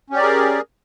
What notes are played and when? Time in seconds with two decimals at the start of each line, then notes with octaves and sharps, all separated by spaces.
0.10 C#4
0.13 G4
0.16 D5
0.19 A#4
0.23 G#4